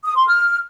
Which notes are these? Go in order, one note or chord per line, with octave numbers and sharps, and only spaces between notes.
D#6
C6
F6